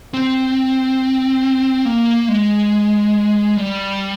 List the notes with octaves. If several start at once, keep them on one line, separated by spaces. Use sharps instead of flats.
C4
A#3
G#3
G3